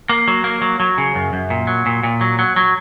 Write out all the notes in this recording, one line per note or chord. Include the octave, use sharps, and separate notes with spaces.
A#3
F#3
A#3
F#3
F#3
C#3
F#2
F#2
A#2
F#3
A#2
A#2
F#3
F#3
F#3